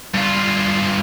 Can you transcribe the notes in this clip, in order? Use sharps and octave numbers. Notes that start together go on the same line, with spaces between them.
G2 F4